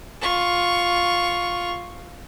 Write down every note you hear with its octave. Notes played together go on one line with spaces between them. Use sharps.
F4 C#6